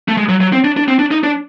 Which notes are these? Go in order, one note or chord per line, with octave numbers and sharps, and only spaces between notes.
A3
G#3
F#3
F#3
C4
D4
D4
C4
D4
D#4
D4